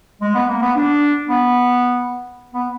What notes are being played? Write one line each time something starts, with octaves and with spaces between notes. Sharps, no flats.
G#3
B3
A#3
B3
D4
B3
B3